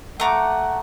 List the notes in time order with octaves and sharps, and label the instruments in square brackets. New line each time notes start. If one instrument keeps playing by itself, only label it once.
[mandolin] A3 A#5 D6 [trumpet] F#5